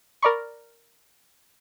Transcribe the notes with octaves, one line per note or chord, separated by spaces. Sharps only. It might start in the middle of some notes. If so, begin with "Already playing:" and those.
A#4 D5 B5 C#6